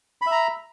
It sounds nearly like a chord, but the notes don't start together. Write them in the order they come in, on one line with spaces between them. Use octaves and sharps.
B5 E5 A#5